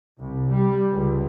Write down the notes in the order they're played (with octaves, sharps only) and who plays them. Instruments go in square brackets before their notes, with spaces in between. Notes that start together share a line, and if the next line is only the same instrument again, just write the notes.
[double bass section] C2
G3
C#2